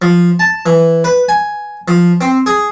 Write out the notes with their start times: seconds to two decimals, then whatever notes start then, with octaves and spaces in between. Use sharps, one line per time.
0.02 F3
0.39 A5
0.66 E3
1.04 B4
1.29 G#5
1.88 F3
2.21 C4
2.46 G#4